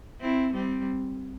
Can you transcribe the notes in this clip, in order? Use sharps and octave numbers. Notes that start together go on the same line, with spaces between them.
C4 E4
G3 C4